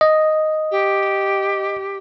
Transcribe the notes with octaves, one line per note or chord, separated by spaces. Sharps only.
D#5
G4